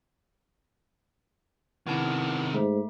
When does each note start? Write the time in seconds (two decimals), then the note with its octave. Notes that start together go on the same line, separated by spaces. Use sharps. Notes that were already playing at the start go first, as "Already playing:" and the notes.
1.87 C3 D#3 B3 E4 A5
2.54 G#2 A3